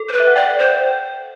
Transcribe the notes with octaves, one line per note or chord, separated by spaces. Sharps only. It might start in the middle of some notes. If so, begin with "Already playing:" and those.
Already playing: A4
C5
B4
E5
F#5
D5 G5
C5